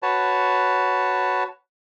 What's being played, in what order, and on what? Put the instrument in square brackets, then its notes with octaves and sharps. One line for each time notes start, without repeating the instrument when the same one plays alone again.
[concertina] F#4 B4 C#5 A5